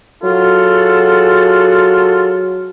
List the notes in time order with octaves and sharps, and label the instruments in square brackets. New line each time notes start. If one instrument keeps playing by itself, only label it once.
[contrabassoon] F#3 [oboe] F4 [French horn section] F#4 G#4 A4